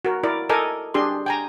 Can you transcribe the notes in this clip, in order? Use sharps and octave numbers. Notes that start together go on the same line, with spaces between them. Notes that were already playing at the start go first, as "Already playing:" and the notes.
F#4 A#4
E4 A#4 D5
A4 A#4 D#5 G#5 D6
D4 G4 G#4 C6
G5 G#5 A#5